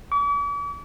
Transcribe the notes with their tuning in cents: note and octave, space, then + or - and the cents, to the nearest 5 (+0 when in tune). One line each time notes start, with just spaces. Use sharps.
D6 -45